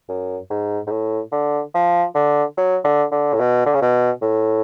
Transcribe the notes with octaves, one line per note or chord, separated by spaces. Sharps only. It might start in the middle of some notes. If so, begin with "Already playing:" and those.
F#2
G#2
G#2
A2
D3
F3
D3
F#3
D3
D3
A2
B2
D3
C#3
B2
A2